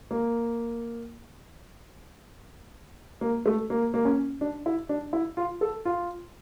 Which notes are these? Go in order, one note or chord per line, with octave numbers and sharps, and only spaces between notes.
A#3
A#3
A3
A#3
A#3
C#4
D4
E4
D4
E4
F4
A4
F4